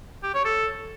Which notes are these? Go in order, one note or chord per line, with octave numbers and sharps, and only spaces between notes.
G4
C#5
A4